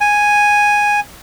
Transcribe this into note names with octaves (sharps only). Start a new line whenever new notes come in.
G#5